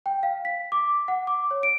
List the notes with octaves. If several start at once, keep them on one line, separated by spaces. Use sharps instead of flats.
G5
F5
B6
D6
F#5
D6
C#5
D7